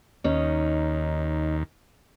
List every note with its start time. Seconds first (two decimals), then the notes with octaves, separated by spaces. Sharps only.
0.24 D#2 C#4 D#4